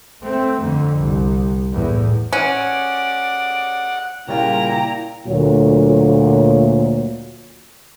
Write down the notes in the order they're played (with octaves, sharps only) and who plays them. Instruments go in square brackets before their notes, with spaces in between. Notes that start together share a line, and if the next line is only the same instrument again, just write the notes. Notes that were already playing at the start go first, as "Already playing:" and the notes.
[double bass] A3 C4
F2 D3
C2
E2 A2
[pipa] C#4 [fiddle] D5 D6 [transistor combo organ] F#5
[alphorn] A#2 [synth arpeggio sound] C#3 G3 F4 [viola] E4 A#5 [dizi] G5
[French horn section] D2 A#2 F#3